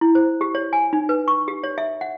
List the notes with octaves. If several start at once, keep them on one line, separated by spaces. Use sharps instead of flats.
E4
C5
G4
C#5
G#5
D#4
B4
C#6
G4
C#5
E5
F#5